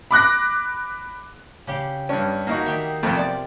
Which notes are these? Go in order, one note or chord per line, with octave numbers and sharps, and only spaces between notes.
B5 D6 F#6 A#6
C#3 G4
G2 C#4 D4
A#3 D#4 E4 F#4 A#4
D#3 G4 E5
B1 F2 C3 A3 F4 G4
D5